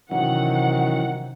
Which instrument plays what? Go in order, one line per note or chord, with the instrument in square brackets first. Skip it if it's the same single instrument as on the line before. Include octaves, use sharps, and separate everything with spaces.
[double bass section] C3 [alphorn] D#3 [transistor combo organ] E3 F#3 C#4 [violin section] F#5